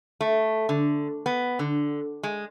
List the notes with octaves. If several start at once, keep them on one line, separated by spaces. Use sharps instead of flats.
A3
D3
B3
D3
G#3